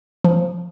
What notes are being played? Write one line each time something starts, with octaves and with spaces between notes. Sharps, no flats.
F3